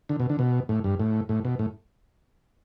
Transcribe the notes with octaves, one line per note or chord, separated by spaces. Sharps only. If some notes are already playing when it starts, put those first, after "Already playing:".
D3
B2
D3
B2
A2
G2
A2
A2
B2
A2